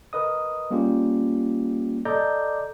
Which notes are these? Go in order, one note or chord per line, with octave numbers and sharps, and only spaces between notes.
A#4 B4 D#5 D#6
G3 A#3 C#4 F4 G4
A4 D5 D#5 A#5 D6 G6